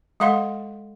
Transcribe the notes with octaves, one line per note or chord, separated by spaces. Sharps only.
G#3 A4 F5 F#5 C6